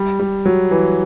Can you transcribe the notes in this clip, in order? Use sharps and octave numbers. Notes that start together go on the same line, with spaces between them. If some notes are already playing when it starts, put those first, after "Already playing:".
Already playing: G3
G3
F#3
E3